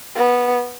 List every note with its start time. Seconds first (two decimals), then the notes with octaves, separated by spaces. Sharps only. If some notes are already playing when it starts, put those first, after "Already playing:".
0.16 B3